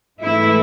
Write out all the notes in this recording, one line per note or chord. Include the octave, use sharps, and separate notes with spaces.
G#2 E3 A3 E4